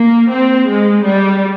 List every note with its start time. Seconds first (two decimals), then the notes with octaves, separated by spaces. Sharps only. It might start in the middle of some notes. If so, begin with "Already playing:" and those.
Already playing: A#3
0.30 C4
0.67 G#3
1.04 G3